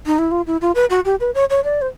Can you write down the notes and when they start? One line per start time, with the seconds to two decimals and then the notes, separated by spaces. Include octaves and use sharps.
0.06 D#4
0.19 E4
0.31 F4
0.47 E4
0.61 F4
0.75 B4
0.90 F#4
1.05 G4
1.20 B4
1.35 C#5
1.50 C#5
1.64 D5
1.82 C5